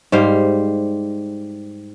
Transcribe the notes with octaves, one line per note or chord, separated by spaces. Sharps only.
G#2 G3 C5 F5